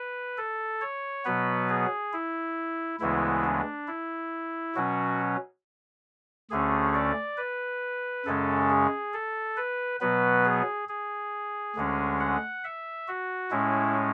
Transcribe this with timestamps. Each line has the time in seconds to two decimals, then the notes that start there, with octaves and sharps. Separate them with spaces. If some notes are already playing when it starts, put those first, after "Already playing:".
Already playing: B4
0.38 A4
0.81 C#5
1.25 B2 F#3 B3 B4
1.69 G#4
2.13 E4
3.00 D2 C#3 E3 G#3 B3 E4
3.44 D4
3.88 E4
4.75 B2 F#3 C#4 F#4
6.51 D2 D3 A3 C#4 G#4
6.95 D5
7.37 B4
8.25 F#2 C#3 G#3 C#4 A4
8.70 G#4
9.14 A4
9.57 B4
10.01 B2 F#3 B3 B4
10.45 G#4
10.89 G#4
11.76 D2 D3 G#3 C#4
12.20 F#5
12.64 E5
13.08 F#4
13.51 A2 G#3 C#4 E4